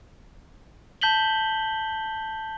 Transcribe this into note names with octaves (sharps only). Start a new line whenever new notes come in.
A5 G6 B6 F#7 G7